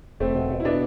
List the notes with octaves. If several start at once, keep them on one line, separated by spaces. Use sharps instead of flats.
E1 A3 C4
B2
B2
E4
B2 B3 D4